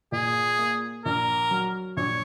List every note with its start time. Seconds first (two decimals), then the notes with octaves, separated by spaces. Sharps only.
0.12 A#2 G#4
0.59 A#3
1.05 A#1 A#4
1.51 F#3
1.97 A#1 C#5